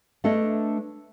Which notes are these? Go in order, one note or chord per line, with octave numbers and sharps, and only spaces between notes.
A3 D4 A4 B4 C#5 D#5